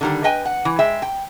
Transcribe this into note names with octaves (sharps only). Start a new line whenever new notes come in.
D3 D#3 G3
B4 D#5 G5 G#5
F#5
E3
G#3 E5 G5
G5